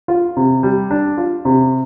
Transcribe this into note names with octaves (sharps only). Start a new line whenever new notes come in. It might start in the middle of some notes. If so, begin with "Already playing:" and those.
F4
C3
G3
D4
F4
C3